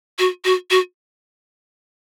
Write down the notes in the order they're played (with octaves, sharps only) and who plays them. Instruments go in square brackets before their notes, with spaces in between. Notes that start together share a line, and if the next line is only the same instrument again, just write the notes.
[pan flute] F#4
F#4
F#4